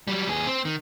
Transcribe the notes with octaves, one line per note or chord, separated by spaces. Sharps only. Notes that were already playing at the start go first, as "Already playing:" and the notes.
F#3 G3
D#2 G#4
C4
D#3